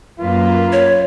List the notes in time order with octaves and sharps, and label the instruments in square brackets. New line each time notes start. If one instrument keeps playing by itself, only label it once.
[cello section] F#2 A#3 B4 [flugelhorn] F4
[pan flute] C#5